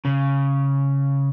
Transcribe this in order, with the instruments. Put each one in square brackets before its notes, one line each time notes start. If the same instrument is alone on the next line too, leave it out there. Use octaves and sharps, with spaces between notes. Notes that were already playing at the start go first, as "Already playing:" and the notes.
[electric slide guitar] C#3